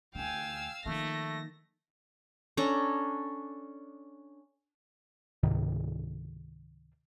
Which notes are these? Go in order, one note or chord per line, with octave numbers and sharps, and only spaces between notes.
D2 D3 F5 G5 G#5 E6
D#3 F3 A3 A#3 D#4 A#6
C#4 D4 A4 A#5
C#2 G#2 C3 D#3